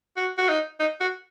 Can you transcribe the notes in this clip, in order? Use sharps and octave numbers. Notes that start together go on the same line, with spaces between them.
F#4
F#4
D#4
D#4
F#4